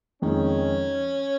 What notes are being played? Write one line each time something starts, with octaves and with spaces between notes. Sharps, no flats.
F2 D#3 G#3 C#4 D#4